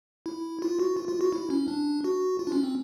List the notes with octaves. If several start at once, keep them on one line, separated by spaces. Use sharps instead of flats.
E4
F4
F#4
F4
F4
F#4
E4
C#4
D4
F#4
F4
D4
C#4
C4